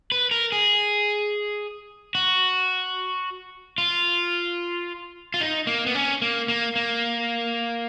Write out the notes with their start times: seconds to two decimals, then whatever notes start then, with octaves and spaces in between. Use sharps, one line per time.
0.12 B4
0.31 A#4
0.52 G#4
2.15 F#4
3.78 F4
5.34 F4
5.41 D#4
5.67 A#3
5.86 B3
5.95 C#4
6.22 A#3
6.48 A#3
6.76 A#3